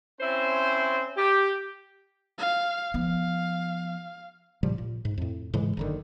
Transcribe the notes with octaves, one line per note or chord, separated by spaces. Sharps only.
C4 C#4 E4 C5
G4
F5
F3 B3 F5
A#2 C#3 F3 G3
A#2
G#2
F2 A2
G#2 C#3 E3 G#3
F#1 D3 D#3